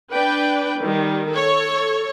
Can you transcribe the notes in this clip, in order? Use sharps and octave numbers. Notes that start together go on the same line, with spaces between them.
D4 B4 G5
D#3 G3
A4 C#5